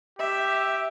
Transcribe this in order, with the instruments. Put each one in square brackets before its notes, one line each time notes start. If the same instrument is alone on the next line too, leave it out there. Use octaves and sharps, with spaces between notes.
[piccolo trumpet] G4 [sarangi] E5